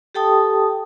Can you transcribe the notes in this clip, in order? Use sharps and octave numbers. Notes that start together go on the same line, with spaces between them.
G4 A4 G5 A5 D#6